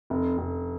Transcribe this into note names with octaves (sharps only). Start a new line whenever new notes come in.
F1
F1